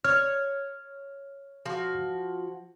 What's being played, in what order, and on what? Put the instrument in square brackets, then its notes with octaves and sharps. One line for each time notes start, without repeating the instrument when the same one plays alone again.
[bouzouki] C#5 [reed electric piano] F6
[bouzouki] F3 F#4